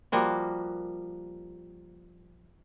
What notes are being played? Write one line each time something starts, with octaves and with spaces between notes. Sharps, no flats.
F3 G3 A#3 F#4